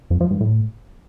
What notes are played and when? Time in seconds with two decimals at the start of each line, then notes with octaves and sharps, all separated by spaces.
0.10 F2
0.21 F3
0.31 G2
0.41 A2